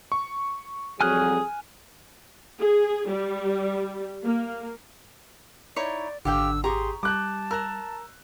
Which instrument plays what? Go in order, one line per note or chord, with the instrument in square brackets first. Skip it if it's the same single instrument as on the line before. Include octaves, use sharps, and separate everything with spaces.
[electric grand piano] C#6
[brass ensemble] F2 F#3 G3 [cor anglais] G#4 [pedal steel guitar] G#5 F6 F#6
[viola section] G#4
G3
A#3
[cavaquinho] D#4 E4 C#5 [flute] D5
[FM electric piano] G#1 [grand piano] D3 [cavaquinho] G4 F5 G5 [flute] E6
[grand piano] G4 G#4 [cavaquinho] A#5 C#6 [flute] C6
[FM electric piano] G3 [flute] A5 [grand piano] D6 F#6 G6
[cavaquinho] A#4 A#5 [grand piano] E6 F#6